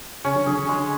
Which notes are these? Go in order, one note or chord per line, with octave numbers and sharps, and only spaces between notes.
C#3 C#4
D3 F#3
D3 F#3 G#4
D3
G#3